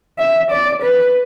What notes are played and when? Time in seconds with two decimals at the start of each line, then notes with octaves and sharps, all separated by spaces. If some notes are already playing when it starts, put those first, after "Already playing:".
0.19 E5
0.51 D5
0.83 B4